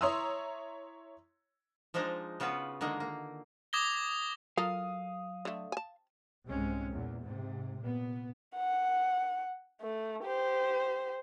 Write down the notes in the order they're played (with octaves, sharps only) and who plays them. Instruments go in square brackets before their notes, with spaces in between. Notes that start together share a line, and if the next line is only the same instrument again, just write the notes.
[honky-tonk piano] E4 C#5 A#5 C6 D#6 E6
[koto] F3 G#3 D4 D#4 D#5
C#3 B3 F4 F#4 B4
D3 D#3 G#3 A#3
A#3
[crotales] D6 D#6 G#6 A#6 G7
[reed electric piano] F#3 [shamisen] F4 A4 A#4 [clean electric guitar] F5 [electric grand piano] D#6
[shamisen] D3 A3
G#5 A5
[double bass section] C2 G#2 G#3 C4 C#4
E2 A#2
G#2 C3
A#2 B3
[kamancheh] F#5
A3
G4 C5